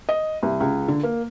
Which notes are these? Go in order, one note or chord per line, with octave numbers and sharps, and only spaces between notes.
D#5
C2
C#2
D3
A#3